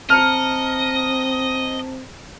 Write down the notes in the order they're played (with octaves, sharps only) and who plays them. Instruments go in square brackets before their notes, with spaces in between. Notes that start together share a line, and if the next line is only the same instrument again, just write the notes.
[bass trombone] C4 [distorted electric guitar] D#5 [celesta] A5 A#5 C#7 [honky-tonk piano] F6